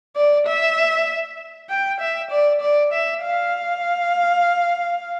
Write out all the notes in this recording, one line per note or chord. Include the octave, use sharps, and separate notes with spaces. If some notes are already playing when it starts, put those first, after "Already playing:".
D5
E5
G5
E5
D5
D5
E5
F5